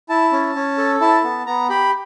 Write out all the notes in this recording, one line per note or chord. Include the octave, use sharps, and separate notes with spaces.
E4 A5
C#4
C#4
A4
E4 A5
B3
B3 A#5
G4 B5